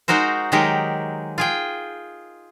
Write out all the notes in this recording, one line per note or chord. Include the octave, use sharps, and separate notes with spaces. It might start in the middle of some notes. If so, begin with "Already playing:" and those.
G#3 D#4 F#4 A#4 C5
D#3 F#3 G#3 G4 A#4
F4 G#4 G5